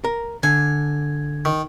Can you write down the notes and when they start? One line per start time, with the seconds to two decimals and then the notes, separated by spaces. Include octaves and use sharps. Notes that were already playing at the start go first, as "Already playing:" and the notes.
0.04 A#4
0.43 D3 G#5
1.45 D#3